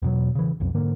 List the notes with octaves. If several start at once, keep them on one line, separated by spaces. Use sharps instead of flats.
E2 B2 F#3
C#3 E3
B1 F2
G#2 D3 A#3